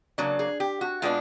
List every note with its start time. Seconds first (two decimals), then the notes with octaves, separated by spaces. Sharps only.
0.18 C#3 F#3 A#3 D4
0.39 G#4
0.60 G4
0.81 F#4
1.02 B2 G#3 B3 D4 F4